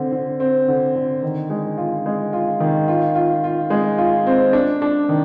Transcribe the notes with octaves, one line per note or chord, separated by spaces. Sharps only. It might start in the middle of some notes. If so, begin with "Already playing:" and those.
Already playing: D3 C4
D3
C4
D3
D3
D#3
G#3
F4
G#3
F4
D#3
F4
F4
F4
G#3
F4
C4
D4
D4
D#3